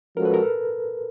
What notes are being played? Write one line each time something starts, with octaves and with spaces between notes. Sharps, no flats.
F3 G#3 C#4 F#4 A4 A#4
B4
A#4
A4